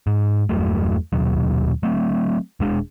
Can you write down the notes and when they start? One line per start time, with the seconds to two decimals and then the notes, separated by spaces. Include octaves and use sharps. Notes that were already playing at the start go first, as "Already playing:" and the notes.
0.07 G#2
0.49 E2 G2 F#3 A3
1.13 D#1 D#2 B2 F#3
1.83 F#3 A3 C4
2.60 E1 G#3 D4